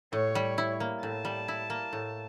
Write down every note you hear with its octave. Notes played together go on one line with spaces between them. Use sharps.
A2 C#5
G3
E4
A#3
A2 A5
G3
E4
A#3
A2